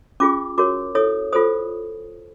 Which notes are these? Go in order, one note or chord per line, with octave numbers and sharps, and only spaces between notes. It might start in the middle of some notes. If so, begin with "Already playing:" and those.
C#4 F4 G#4 D6
F#4 A#4 C#5 D6
E4 A4 C#5 D#6
F4 A4 C5 D#6